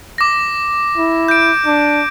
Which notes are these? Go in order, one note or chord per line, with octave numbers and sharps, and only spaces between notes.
D6 A#6
E4
G6 D7
D4